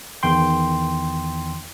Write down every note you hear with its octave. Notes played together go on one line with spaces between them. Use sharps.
E2 D#3 G5 C6